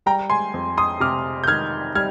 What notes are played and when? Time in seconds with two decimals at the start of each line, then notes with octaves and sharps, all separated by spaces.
0.06 G3 G5 A#5
0.30 G#5 C6
0.54 F2
0.78 C6 D#6
1.00 C3 D6 F6
1.44 G6
1.47 D#3 F6 G#6
1.95 G3 F6 G#6